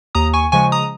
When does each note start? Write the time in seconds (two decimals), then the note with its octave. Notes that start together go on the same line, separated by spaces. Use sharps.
0.15 D#2 A#5 D#6
0.33 G#5 C#6
0.52 C#3 F3 G#3 G#5 C#6
0.72 A#5 D#6